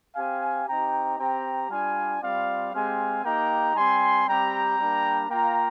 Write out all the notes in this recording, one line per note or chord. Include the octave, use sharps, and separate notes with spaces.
C4 G4 F5 G#5
C4 D#4 G4 G5 A#5
C4 G4 G5 A#5
G3 D4 F4 F5 G#5
G3 C4 F4 D5 F5
G#3 C4 G4 F5 G#5
A#3 D#4 G4 G5 A#5
G3 C4 G4 G#5 C6
G3 C4 G4 G5 A#5
G3 A#3 D4
A#3 F4 G5 A#5